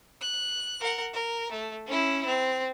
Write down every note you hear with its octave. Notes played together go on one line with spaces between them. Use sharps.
F#6
A#4 F#5
A#4
A3
C#4 E4
C4